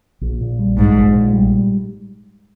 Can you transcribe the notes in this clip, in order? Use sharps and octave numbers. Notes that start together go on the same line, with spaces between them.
A#1
A#2
G3
A#1 G#2
A#1
A#2
G3